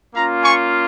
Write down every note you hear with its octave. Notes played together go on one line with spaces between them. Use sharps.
A#3 C#4 F4 F5 A#5
G#5 C#6